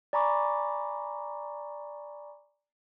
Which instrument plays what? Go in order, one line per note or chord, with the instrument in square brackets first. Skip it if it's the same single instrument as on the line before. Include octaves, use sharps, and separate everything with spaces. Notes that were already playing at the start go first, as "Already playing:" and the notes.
[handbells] D5 G#5 A#5 B5 C#6 D6